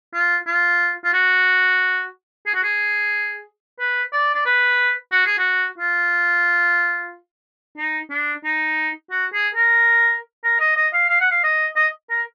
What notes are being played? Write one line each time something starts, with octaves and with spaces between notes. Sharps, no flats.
F4
F4
F4
F#4
G#4
F#4
G#4
B4
D5
D5
B4
F#4
G#4
F#4
F4
D#4
D4
D#4
F#4
G#4
A#4
A#4
D#5
D#5
F5
F5
F#5
F5
D#5
D#5
A#4